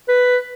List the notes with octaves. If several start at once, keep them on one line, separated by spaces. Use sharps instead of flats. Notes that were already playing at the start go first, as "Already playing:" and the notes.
B4